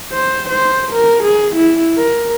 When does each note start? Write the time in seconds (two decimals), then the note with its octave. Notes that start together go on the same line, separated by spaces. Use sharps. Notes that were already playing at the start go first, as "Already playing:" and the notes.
0.13 C5
0.50 C5
0.92 A#4
1.24 G#4
1.56 E4
1.98 A#4